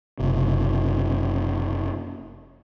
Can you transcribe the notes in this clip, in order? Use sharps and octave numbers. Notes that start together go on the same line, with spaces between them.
F#1 C3